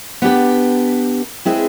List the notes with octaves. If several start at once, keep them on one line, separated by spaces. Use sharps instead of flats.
B3 D4 G4 B4
G#3 C4 E4 G#4 B4